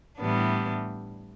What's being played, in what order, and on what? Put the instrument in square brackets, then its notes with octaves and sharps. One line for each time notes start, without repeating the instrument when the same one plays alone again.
[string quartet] A2 E3 G3 B3 D4